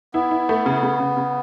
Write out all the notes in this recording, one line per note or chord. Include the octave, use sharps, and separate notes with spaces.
B3 E4
E4
A3
C#3
C#3
C#3
C#3